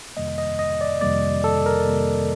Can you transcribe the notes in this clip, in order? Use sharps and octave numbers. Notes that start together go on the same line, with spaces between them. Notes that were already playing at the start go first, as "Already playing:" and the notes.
F2 C3 D#3 G3 A#3 D#5
D#5
D#5
D5
F2 C3 D#3 G3 A#3 D5
A4
A#4
F2 C3 D#3 G3 A#3